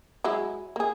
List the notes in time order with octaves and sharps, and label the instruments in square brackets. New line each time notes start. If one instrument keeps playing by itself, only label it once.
[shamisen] F#3 G#3 E4
A#3 G#4